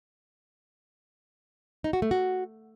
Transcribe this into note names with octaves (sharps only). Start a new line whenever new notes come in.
D#4
F#4
A3
F#4